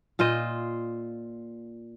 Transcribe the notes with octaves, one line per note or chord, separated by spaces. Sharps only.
A#2 F4 C5 D#5